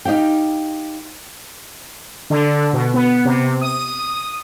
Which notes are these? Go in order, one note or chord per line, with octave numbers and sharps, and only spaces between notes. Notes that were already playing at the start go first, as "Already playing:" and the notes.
D#4 G4 F5 G5
D3
B2
B3
C3
D#6